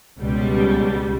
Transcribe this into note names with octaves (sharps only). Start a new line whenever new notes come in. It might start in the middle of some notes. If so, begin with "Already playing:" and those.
C#2 B2 G3